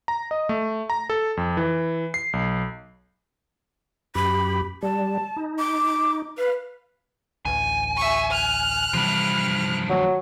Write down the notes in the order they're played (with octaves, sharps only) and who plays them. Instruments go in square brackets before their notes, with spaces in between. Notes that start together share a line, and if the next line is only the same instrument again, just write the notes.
[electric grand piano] A#5
D#5
A3
A#5
A4
F2
E3
C7
B1
[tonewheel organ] F#2 G4 [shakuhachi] B5
[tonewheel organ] G3 [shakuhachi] A5
[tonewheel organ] D#4
[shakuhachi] D6
[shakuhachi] B4 [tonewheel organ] F5
[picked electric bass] A1 D2 [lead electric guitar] G#5
[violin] E5 C#6
F6 F#6
[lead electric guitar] G2 F3 [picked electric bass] C3 E3 G3
[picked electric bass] D#3 A3 [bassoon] F#3